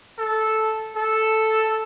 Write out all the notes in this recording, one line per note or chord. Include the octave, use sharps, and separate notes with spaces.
A4
A4